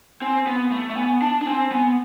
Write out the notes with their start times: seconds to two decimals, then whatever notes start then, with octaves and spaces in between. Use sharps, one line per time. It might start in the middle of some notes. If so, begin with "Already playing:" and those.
0.21 C4 G#5
0.47 B3
0.71 A3
0.90 A3
0.97 B3 G#5
1.21 D4 A5
1.42 D4
1.46 C4 G#5
1.71 B3 G#5